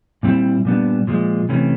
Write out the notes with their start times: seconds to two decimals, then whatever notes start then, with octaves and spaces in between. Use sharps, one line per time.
0.23 A#2 G3 C4 E4
0.65 A#2 G3 B3 D4
1.07 A#2 F3 G#3
1.49 C3 E3 A3 C#4